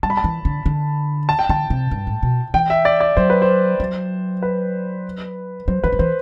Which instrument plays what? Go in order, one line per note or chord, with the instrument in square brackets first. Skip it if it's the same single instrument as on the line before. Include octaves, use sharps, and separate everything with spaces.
[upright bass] G3 [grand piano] A5
[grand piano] B5
A5
[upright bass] E3
D3
D3
[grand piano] A5
G5
[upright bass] D3 [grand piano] A5
[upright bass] C3
G2
A2
B2
[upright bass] E3 [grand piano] G5
[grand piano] E5
D5
D5
[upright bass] F#3 [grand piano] C5
[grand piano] B4
C5
[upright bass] F#3
[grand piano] B4
[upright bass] F#3 [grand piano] C5
[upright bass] E3 [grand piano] B4
[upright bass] F#3
[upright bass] E3 [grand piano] C5